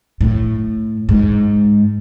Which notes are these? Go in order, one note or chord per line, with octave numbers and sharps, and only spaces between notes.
A2
G#2